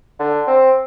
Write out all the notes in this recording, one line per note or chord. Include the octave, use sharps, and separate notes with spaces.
D3
C4